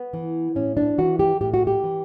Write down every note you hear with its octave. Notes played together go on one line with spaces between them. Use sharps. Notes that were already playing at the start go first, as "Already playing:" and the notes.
Already playing: B3
E3
A2 C#4
D4
E3 F#4
G4
A2 G4
F#4
G4
E3